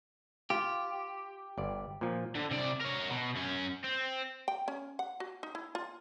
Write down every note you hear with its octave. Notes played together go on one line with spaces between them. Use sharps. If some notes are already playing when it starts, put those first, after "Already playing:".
F4 G4
G1 D5
A#2 F3
D3
C3 D5
A#4 C#5
B2
F#2 C#4
C4
G5
C#4
F#5
F#4
D#4
E4
F4